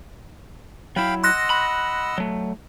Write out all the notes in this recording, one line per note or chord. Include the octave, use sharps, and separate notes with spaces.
F#3 E4 F5 G5 B5
D#5 F#5 C6 E6 F#6 A#6
B5
F#3 A3